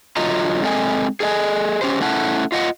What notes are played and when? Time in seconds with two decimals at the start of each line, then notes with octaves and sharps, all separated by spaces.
0.16 D3 F#3 F4 D#5 A#5
0.63 G#3 C4 A4 D#5 G#5
1.20 G#4 A4 C#5 D#5 G#5
1.81 C#4 G4 C5
2.01 A3 C#4 E4 F#5 A5
2.52 F4 D#5 F#5